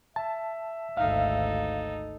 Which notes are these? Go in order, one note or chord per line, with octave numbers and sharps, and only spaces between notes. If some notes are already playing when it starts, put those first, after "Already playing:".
E5 A5
G#1 D2 D#4 A4 F5